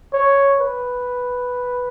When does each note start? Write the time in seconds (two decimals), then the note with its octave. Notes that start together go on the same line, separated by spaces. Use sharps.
0.13 C#5
0.60 B4